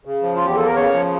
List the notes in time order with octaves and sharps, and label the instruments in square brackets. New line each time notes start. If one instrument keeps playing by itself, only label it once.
[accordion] C#3
F3
F4
E2 G4
A#3 A4
A#4
C#3 C#5
F3